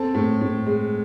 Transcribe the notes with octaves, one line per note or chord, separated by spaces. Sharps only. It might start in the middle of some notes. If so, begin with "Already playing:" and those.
Already playing: C4 A4 A5
A2
A2
G#3